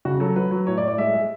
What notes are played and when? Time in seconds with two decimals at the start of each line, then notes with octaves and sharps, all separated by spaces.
0.05 C#3 F#4
0.20 F#3 A4
0.36 F#3 B4
0.51 F#3
0.67 A2 C#5
0.78 D5
0.82 A2
0.88 D5
0.98 G#3 E5
1.14 G#3